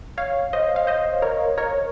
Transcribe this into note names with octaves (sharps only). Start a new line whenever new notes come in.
C#5 F5
C5 D#5
F5
C5 D#5
A#4 C#5
A#4 C#5